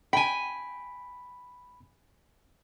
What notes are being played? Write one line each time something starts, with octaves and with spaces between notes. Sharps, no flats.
G5 G#5 B5